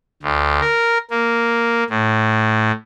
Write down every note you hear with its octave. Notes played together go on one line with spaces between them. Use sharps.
D2
A#4
A#3
A2